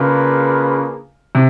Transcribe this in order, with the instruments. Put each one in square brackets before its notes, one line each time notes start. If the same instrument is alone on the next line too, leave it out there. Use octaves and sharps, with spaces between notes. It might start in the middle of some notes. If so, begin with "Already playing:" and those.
Already playing: [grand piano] C#3 [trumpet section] A#3 D4 F4 G#4 B4
[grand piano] C3